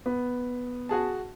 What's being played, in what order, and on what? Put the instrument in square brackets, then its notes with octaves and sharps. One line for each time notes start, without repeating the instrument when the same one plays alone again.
[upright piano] B3
[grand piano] F#4 G#4 A5